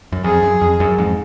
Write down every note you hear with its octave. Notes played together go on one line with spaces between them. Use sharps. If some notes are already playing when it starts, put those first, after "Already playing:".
F#2
F2 G#4
F#2
F2
F#2
F2 G#2